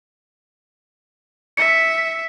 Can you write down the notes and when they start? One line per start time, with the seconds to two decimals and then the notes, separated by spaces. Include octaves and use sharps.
1.57 E5 C#7